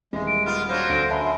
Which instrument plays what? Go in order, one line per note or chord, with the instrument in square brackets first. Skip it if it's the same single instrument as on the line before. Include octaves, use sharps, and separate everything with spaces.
[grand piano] D#1 A#6 [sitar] E3 [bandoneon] G#3
[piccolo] D7
[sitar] B3 F4 [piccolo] F6
[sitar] F#3 D4 [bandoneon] C5 F5 [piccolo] F6
[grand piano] D2 [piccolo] D7
[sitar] F#2 [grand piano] E5 A5 B5 [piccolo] C6